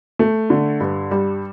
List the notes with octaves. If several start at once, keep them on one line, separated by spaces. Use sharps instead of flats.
A3
D3
G2
G3